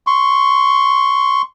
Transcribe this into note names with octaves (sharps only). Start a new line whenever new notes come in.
C6 C#6